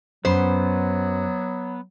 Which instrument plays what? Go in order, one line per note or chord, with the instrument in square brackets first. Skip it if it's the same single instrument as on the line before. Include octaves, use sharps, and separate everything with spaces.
[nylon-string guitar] F#2 [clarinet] F#3 [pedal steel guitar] B3 [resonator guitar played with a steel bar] C5